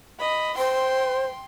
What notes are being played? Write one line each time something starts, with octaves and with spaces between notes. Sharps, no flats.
D#5 B5
C5 G5 C6